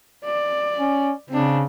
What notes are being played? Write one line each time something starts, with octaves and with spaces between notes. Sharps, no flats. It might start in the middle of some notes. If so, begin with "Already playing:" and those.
D5
C#4
C#3 C4 D4